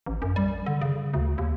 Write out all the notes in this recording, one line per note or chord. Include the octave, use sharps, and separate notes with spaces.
A1
F#2
G3
D3
C#3
D2
D#2